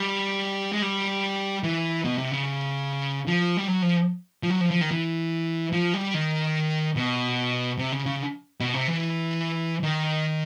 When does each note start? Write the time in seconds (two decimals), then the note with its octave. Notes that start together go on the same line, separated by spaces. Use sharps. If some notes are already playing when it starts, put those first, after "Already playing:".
Already playing: G3
0.73 G#3
0.82 G3
1.63 E3
2.05 B2
2.18 C3
2.32 C#3
3.27 F3
3.57 G3
3.68 F#3
3.82 F3
4.43 F3
4.50 F#3
4.60 F3
4.71 F3
4.81 D#3
4.91 E3
5.73 F3
5.94 G3
6.14 D#3
6.96 B2
7.78 C3
7.92 C#3
8.06 C#3
8.60 B2
8.74 C3
8.88 E3
9.83 D#3